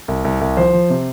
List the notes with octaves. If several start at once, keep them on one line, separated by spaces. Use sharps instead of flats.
C2
C2
C2
F3 C5
F3
C3